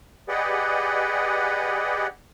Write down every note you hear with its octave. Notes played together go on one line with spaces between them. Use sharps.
G4 G#4 B4 D5 D#5 F#5